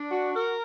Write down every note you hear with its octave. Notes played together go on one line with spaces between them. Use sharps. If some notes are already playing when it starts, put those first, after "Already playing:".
Already playing: D4
F#4
A#4